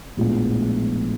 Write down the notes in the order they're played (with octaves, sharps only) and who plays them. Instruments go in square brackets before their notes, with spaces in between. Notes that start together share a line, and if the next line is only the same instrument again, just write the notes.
[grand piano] A#1 A2 F3 G#3 B3